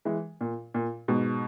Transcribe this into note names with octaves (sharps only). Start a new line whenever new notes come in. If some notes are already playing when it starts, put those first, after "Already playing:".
E3 G#3
A#2
A#2
G#2 B2